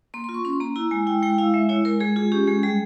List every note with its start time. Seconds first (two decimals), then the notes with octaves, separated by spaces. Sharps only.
0.14 A#3 C6
0.24 C6
0.29 F4
0.34 C#6
0.45 C#4 C6
0.60 A#3 A#5
0.76 E4 A#5
0.91 G#3 G#5
1.07 E4 G5
1.23 G#3 G5
1.38 E4 F5
1.54 G#3 E5
1.69 E4 C#5
1.85 G#3 A#4
2.00 G#3 G#4
2.16 F4 G#4
2.32 C#4 G4
2.47 G#3 G#4
2.63 G3 G#4